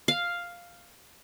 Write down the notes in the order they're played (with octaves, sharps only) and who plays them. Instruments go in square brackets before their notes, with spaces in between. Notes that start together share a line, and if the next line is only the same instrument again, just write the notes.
[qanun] F5